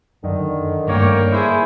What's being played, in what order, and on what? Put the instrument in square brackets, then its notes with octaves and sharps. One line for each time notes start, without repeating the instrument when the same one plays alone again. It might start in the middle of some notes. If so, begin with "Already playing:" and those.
[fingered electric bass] F#2 [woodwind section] D3 D#3
[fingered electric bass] G2 A3 [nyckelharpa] A#3 G5 [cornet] C#5
[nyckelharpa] E4 G#4 [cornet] C5